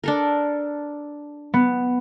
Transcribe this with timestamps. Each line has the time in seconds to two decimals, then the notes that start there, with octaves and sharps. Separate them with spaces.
0.04 D4 A4 A#4
1.54 B3